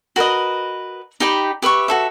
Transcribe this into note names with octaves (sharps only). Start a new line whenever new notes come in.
F#4 A#4 B4 D#5
D#4 G4 G5 B5
G4 B4 E5 C#6
F#4 A4 E5